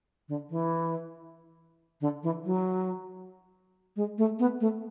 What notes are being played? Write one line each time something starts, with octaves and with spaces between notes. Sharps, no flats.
D3
E3
D3
E3
F#3
G#3
A3
B3
A3